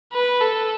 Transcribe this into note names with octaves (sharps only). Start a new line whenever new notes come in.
B4
A4